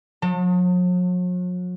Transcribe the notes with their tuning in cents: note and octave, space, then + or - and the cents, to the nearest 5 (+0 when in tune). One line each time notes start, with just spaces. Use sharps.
F#3 -45 A5 +30